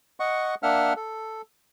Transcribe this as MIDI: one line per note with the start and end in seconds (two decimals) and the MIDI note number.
0.20 0.55 75
0.20 0.55 78
0.20 0.55 85
0.63 0.93 58
0.63 0.93 62
0.63 0.93 76
0.63 0.93 78
0.63 0.93 89
0.96 1.42 69